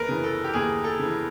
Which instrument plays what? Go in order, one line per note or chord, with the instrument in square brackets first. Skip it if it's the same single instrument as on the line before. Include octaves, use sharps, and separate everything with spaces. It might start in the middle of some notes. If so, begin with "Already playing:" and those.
Already playing: [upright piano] D#2 [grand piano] A#4 B4
[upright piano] C#3 E3
[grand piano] A4
G4
[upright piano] D#2 [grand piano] G#4
[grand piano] A4
[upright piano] C#3 E3